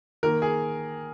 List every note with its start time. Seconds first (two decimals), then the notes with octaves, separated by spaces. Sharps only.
0.23 D#3 A#3 A#4
0.42 G#4